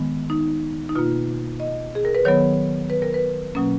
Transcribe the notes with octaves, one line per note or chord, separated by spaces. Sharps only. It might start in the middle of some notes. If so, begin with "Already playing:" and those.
Already playing: D#3 G#3 B3
D#4
D#4
B2 A#3 F4
D#5
G#4
A#4
B4
D#3 F#3 B3 C#5
B4
A#4
B4
B2 F#3 A#3 C#4